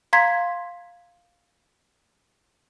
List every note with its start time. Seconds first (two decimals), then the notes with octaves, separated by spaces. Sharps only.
0.13 F5 A#5 C6 G#6 B6